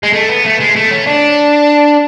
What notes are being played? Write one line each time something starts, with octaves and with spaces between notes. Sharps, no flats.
G#3
A3
B3
A3
G#3
A3
C#4
D4